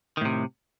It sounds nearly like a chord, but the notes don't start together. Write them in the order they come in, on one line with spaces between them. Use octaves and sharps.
D#3 A2 C3